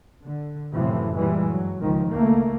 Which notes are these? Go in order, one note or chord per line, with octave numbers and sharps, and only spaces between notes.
D3
F#2 A2 C3 E3 F3
A#2 E3 G3 G#3
G2 F#3
C#2 D#3 F3
C#2 A3 A#3